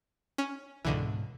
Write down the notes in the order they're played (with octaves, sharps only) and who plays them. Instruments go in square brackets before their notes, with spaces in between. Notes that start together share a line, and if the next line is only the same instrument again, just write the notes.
[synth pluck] C#4
[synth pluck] C#2 D3 E3 [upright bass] G#2 B2